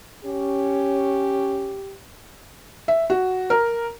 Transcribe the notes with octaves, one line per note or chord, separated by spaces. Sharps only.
C#4 G4
E5
F#4
A#4